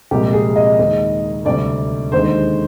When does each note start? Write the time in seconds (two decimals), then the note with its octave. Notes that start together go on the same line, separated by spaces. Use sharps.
0.11 C2 A#2 F3 G#3 G4
0.33 G#4
0.56 D#5
0.78 D#2 D#3 G#3
1.45 D2 C3 G3 D5
2.12 D#2 D3 G#3 C5